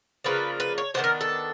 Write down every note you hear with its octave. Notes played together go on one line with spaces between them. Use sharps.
C#3 F3 A#3 D4 B4
B4
C#5
D#3 G3 B3 D4 C5
A#4
A4